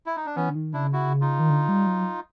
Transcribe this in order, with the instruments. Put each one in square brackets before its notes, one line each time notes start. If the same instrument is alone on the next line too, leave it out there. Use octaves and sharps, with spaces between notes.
[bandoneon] E4
D#4
D4
[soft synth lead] E3 [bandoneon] B3 C#4
[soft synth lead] D3
D#3
[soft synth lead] C#3 [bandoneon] D4 E4
[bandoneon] E4 F#4
D#4 F4
[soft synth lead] D#3
D3
G3
F#3